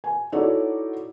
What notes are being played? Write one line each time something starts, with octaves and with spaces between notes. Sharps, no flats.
G#5
D#4 E4 F#4 A4 C#5 D5